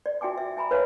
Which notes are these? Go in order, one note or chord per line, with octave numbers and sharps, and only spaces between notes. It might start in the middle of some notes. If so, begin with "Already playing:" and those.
D5
F#4 E5 G5 G#5 D6
E5
E5 G#5 A#5 B5
B4 C#5 E5 F5 G#5